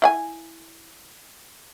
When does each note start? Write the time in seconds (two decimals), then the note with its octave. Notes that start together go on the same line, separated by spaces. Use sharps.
0.02 E4 F#5 G#5